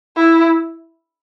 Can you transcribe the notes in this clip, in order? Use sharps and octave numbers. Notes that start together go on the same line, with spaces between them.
E4